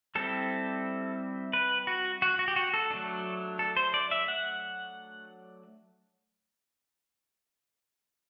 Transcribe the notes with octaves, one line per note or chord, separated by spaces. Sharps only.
G3 C4 E4 A4
B4
F#4
F#4
F#4
G4
F#4
A4
F#3 A3 D4
A4
C5
D5
E5
F#5